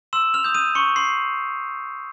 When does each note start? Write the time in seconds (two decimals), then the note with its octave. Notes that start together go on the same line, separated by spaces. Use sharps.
0.13 C6 E6 E7
0.34 F6 F7
0.44 D#6 G6
0.55 D#6 D#7
0.75 C6 C#6 C#7
0.96 C6 C7